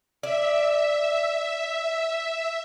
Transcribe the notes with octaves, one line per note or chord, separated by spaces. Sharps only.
D5 E5